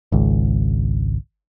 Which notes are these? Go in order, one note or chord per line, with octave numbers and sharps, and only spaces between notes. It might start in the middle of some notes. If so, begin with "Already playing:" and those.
G#1 C#2